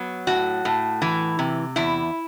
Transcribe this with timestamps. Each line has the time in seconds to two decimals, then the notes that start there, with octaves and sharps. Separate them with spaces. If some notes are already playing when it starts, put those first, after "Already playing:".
Already playing: F#3 B3
0.27 A2 F#4
0.65 A2
1.02 E3
1.39 C3
1.76 E2 E4